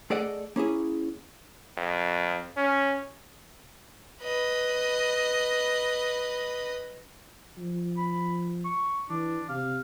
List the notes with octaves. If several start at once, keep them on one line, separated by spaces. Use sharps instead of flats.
A3 G#4 A4 D5 D#5 F#5
A#3 C#4 E4 G#4
F2
C#4
B4 D#5
F3
B5
C#6
E3 D4
C3 F5